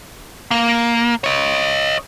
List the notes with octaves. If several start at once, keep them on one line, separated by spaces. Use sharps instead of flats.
A#3
C#5 D#5